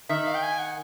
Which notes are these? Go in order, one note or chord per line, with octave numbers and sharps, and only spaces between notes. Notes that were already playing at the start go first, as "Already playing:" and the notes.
D#3 E5
F5
G5
G#5
F#5